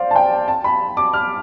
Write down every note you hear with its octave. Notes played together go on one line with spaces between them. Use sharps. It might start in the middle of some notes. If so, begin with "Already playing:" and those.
Already playing: C5 D5 F5
A5
G5
A5
B5
D6
F6